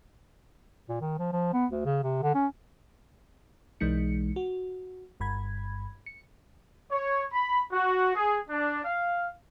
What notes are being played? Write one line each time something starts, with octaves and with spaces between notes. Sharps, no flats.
A#2
D#3
F3
F3
B3
D2
C#3
C3
D3
C#4
B1 E3 G#3 D#4 C#7
F#4
G1 G2 B5 G#6
C#7
C#5
B5
F#4
G#4
D4
F5